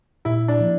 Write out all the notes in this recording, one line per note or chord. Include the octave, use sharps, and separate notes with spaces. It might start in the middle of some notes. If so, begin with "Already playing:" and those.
A#2 E4
D4
F3 A#3 D4